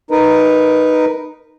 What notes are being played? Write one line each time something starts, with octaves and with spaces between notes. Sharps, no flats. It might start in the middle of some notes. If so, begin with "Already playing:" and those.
D#4 A#4 B4